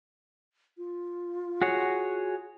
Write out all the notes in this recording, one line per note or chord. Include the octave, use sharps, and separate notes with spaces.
F4
F#4 G#4 C#5